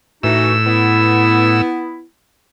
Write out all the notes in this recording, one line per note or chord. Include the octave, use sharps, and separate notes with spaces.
A2 E3 D#4 F#4 E6
B3 E4